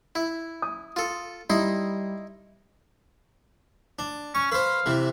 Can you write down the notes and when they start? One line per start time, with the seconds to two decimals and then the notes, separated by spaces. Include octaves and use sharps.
0.15 E4
0.62 D#6
0.96 F4 A4
1.50 G3 D#4 E4 C6
3.99 D4
4.35 C#4 C#6
4.52 B4 C5 F5
4.86 C3 E3